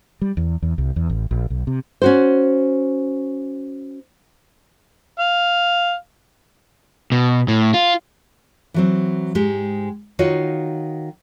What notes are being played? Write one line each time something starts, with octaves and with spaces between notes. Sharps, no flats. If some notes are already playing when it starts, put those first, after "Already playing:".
G3
E2
E2
C2
E2
A1
A#1
B1
C3
C#4 F#4 C5
F5
B2
A2
F4
E3 F#3 C4
G#2 G#3 G4
D#3 D#4 F4 F#4 C#5